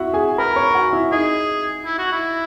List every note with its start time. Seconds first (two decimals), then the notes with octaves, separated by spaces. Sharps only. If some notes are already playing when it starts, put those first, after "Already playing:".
Already playing: E4 F#4 E5 F#5
0.13 G#4 G#5
0.38 A#4 B4 B5
0.56 C#5 C#6
0.75 F#4 F#5
0.93 E4 E5
1.12 D#4 G#4 D#5
1.85 E4
1.98 F#4
2.12 E4